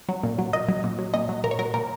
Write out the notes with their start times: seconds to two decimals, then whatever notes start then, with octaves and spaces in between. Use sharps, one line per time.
0.09 F#3
0.23 A#2
0.39 F#3
0.53 A#2 D#5
0.69 F#3
0.84 A#2
0.99 F#3
1.14 A#2 D#5
1.29 F#3
1.44 A#2 A#4
1.51 C#5
1.59 F#3 A#4
1.74 A#2 A#4